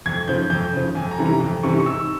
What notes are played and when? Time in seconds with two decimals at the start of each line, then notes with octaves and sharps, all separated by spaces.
0.06 F2 G#6
0.28 C#3 F3 G6
0.50 F2 G6
0.73 C#3 F3
0.95 F2 G#5
1.11 A#5
1.18 C3 E3 G3 C#4
1.26 A#5
1.40 F2
1.63 C3 E3 G3 C#4 C#6
1.80 C#6
1.86 G#2 E6